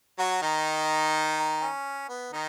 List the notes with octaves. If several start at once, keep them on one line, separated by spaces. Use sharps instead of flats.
F#3 F#4
D#3 D#4
C#4
B3
D#3 D#4